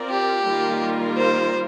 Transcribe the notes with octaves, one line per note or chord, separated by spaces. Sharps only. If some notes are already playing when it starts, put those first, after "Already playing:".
Already playing: C4 F4 A#4 D5
G4
D#3 G3 A#3 F4 A#4
C5